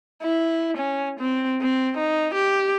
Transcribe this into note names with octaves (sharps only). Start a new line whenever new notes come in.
E4
C#4
C4
C4
D#4
G4